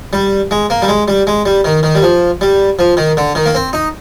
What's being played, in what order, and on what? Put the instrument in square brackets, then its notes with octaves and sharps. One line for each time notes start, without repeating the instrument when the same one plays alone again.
[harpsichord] G3
G#3
A#3
G3
G#3
G3
G#3
G3
D#3
D#3
G3
F3
G3
F3
D#3
D3
D#3
A#3
C4
D#4